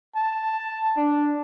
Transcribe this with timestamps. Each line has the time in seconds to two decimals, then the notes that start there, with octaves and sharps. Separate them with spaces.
0.16 A5
0.97 D4